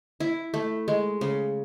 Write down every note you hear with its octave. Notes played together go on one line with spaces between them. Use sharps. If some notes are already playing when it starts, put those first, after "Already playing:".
E4
A3
G#3
C#3